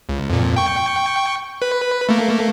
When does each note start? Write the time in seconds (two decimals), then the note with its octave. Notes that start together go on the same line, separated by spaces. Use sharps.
0.09 C#2
0.29 F2 A#2
0.56 G5 C#6
1.62 B4
2.09 A3 A#3